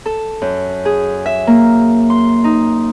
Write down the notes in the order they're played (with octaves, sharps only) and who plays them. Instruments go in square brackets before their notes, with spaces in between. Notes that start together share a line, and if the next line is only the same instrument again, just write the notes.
[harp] A4
F#2
G#4
E5
A#3
C6
D#4